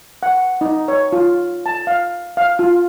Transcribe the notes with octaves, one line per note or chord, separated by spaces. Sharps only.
F#5
D#4
C#5
F4
A5
F5
F5
F4